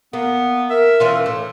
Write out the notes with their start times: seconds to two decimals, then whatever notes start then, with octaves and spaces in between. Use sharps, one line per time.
0.13 A#3 B3
0.70 A#4 E5
1.00 E3 C#4 F4
1.26 A2